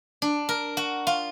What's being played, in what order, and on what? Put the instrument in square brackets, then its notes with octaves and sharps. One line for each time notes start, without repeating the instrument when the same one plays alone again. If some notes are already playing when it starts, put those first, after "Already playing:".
[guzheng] D4
A#4
F#4
F4